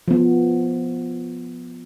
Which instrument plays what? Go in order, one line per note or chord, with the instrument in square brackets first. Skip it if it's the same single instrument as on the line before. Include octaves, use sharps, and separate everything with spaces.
[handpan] F3 B3